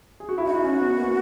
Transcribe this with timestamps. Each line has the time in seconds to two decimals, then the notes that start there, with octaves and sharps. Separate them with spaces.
0.20 G#4
0.29 F#4
0.38 E4
0.47 D#4 F#4
0.57 D#4
0.64 C#4
0.81 B3
0.98 A#3